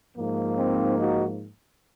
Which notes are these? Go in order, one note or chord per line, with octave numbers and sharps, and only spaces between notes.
G#2 F3 A#3
C4 D#4
D#4 F#4